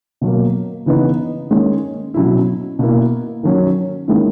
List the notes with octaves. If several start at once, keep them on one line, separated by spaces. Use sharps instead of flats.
B2 F#3 A#3
C#3 E3 B3 D#4
D#3 G#3 C#4
B2 F#3 C#4 E4
B2 A#3 E4
D#3 F#3 C#4
D#3 G#3 C#4 E4